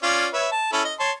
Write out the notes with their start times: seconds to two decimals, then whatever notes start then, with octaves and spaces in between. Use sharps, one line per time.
0.03 C#4 F4 D5
0.33 B4 C#5 E5
0.51 A5
0.73 C#4 E4 A4
0.85 D#5
1.00 C#5 A5 C6